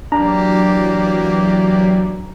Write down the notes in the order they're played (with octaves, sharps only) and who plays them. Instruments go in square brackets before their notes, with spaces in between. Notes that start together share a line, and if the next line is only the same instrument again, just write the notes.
[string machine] E3 F#3 [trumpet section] A#3 G4 D5 [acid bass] D4 [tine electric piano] A#5